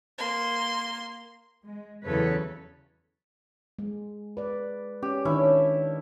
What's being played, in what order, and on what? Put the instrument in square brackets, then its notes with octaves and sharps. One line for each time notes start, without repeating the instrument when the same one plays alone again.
[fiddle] A#3 C6
[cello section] G#3
E2 C#3 F#3 A4 B4 C#5
[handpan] G#3
B4 D5
[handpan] C#4 [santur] G4
[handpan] D#3 D4 [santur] C#4 E4